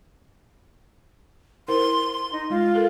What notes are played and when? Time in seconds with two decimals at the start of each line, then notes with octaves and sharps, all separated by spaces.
1.68 E4 A#4 C5 C6
2.13 C6
2.33 D#4
2.50 G#3 F4
2.75 A4 A#4